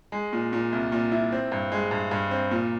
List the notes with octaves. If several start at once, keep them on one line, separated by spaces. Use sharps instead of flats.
G#3
A#2
A#2
C2
A#2
E4
C4
G2
G#3
G2
G2
C4
A#2